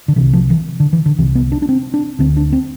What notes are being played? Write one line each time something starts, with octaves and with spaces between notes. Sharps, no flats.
D3
C2 C3 E3
F3
E3
D3
E3
D3
C2 C3 E3
B3
D4
D4
C4
D4
D2 D3 C4
D4
C4